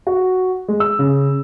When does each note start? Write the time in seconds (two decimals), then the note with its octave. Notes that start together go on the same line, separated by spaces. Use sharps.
0.07 F#4
0.68 G#3
0.80 E6
0.99 C#3